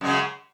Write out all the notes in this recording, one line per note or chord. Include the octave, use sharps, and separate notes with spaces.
F#2 C#3 G#3